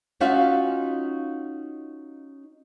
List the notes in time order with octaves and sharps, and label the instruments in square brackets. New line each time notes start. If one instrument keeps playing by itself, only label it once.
[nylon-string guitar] C#4 D#4 F4 F#4 E5 F5